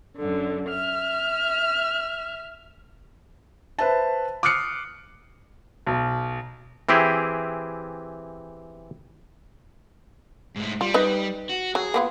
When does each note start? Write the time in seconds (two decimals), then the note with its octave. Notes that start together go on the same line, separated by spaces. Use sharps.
0.16 F#2 D3
0.70 E5 F6
3.79 B4 C5 E5 A5
4.43 D6 D#6 F6 F#6 C7 C#7
5.87 B1
6.89 E3 C4 E4 G4 G#4
10.56 G#2 A3
10.81 G3 F4
10.94 D#4 B4 D#5
11.49 F#4
11.75 F#3 G#4
11.94 A#3 B3 F4